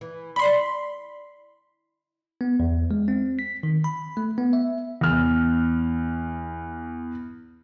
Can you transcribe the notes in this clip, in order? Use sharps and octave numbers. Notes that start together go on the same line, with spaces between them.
E3
D5 B5 C6
B3
E2
G#3
C4
B6
D#3
B5
A3
B3
E5
E2 F6